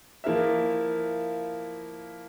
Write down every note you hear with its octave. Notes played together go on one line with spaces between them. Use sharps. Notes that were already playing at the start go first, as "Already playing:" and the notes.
F3 A#3 E4 A#4 E5